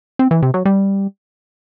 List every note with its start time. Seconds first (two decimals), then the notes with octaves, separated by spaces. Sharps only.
0.19 C4
0.31 E3
0.42 C3
0.54 F#3
0.65 G3